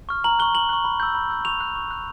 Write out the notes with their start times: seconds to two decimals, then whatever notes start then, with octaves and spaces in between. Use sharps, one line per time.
0.09 C#6 F6
0.24 A#5 F#7
0.39 C#6 F#6 G7
0.54 A#5 F#7
0.69 C#6 F#6
0.85 B5
1.00 E6 G6
1.15 B5
1.30 E6 G6
1.45 C#6 F7
1.60 F#6
1.75 C#6
1.91 F#6